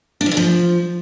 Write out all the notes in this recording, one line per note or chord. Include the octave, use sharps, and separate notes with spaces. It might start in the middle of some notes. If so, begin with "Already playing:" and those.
D4
F3
D3
F3